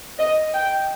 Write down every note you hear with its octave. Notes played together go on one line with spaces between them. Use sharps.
D#5
G5